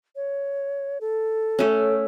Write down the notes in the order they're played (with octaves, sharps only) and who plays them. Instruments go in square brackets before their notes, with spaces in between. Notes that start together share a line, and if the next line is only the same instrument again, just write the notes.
[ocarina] C#5
A4
[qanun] A3 C#4